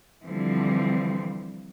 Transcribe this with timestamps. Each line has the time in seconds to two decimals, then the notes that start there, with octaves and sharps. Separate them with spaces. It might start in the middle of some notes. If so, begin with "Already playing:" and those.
0.24 D3 E3 F3 G3 C4